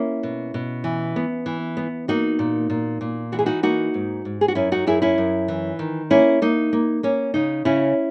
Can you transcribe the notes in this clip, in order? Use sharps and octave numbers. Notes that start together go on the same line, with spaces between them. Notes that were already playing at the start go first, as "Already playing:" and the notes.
Already playing: A#3 C#4 E4
B2
B2
E3
B3
E3
B3
A#3 D#4 F#4
A#2
A#2
A#2
E3 F#4
G#4
D#4 F#4
A#3 D#4 F#4
G#2
G#2
G#4
F#4
F#2 C#4 E4
D#4 F#4
F#2 E4 G#4
C#4 E4
F#2
E3
D#3
A#3 C#4 E4
A#3 D#4
A#3
A#3 C#4
C#3 D#4
C#3 C#4 E4